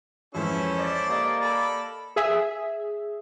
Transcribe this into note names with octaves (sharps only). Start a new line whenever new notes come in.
F2 G#2 E3 C#4 E4 A4 C5
D5
A#3 G4 D#5
A4 B5
G#4 E5